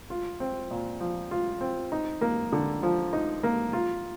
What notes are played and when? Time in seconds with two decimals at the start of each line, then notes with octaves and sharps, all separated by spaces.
0.10 F4
0.40 C4
0.71 A#2
1.00 F3
1.31 F4
1.61 C4
1.92 D#4
2.21 A#3
2.53 D3
2.83 F3
3.13 D#4
3.43 A#3
3.73 F4